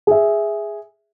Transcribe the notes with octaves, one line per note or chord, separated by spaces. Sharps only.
G#4 E5